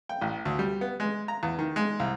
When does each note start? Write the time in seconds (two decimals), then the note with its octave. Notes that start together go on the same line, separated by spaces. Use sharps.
0.09 G5
0.21 A1
0.45 D2
0.59 G3
0.81 B3
1.00 G#3
1.28 A#5
1.43 E2
1.59 D#3
1.76 G#3
2.00 C2